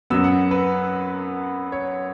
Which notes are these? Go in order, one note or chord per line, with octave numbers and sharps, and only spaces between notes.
F#2 F#3 B3 E6
F#5
B4
C#5